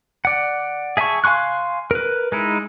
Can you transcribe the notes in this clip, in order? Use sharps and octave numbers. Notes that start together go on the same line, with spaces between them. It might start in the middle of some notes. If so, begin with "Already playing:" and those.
D5 F#5
G#4 E5 G#5 A5 C#6
F5 G#5 C6 C#6 F#6
A#4 B4
G#3 D#4 E4